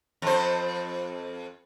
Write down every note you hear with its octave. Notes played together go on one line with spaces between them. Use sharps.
F2 C5